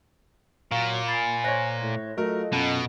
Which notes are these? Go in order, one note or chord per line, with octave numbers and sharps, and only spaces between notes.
A#2 F#3 F5 C#6
G#5 B5 A6 C7
C5 C#5 F#6 A#6
A2
F#3 A3 F4 A4 A#4 D#5
F#2 B2